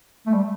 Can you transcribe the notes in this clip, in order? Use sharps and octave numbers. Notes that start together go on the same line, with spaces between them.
A3
G3